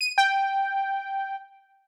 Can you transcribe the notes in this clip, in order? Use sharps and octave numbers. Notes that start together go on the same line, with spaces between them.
D#7
G5